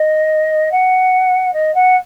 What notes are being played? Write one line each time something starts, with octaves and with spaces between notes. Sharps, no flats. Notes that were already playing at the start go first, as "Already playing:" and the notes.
Already playing: D#5
F#5
D#5
F#5